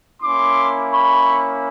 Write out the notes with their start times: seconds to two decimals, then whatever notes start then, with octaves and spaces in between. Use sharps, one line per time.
0.21 A#3 C#4 E4 C6 D6
0.92 B5 C#6